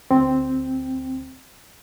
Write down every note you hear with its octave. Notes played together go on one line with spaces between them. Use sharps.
D2 C4